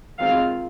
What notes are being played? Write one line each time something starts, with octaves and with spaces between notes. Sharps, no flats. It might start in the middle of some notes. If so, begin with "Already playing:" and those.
D#3 G#3 C4 F4 F5